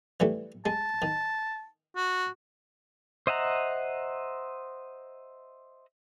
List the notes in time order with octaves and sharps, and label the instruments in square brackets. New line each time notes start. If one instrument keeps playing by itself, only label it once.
[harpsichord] E3 G3 A3
[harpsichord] G#3 [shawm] A5
[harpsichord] D#3
[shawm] F#4
[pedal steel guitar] C5 D#5 E5 F#5 A#5